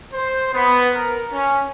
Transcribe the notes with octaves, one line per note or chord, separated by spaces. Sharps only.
C5
B3
A#4
C#4